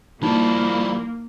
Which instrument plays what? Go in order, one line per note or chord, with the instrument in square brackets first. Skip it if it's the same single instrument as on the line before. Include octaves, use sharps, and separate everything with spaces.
[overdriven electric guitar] F3 G3 [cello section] A#3 [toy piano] D#4 [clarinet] E4